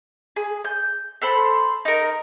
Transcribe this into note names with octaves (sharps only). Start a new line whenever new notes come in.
G#4
G6
A4 C5 B5 C6
D#4 A#4